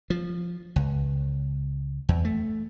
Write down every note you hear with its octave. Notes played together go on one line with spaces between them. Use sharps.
F3
C#2
E2
A3